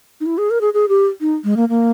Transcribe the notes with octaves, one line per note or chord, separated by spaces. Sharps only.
D#4
E4
G#4
A#4
G#4
G#4
G4
D#4
G#3
A#3
A#3